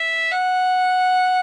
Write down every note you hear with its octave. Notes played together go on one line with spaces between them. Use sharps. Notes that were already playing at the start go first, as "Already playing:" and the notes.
Already playing: E5
F#5